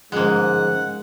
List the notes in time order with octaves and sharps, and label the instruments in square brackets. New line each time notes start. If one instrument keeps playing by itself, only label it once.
[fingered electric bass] G1 F3 C#4 [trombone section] G#2 [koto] G#3 A#3 [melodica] F#5